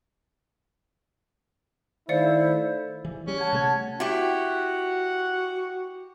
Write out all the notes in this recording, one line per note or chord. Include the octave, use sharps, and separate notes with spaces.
D#3 A3 E4 C5 D5 F5 C#7
E3
G3 C#4
F#5 A5 G#6
C3 A3
E4 F#4 G4 F#5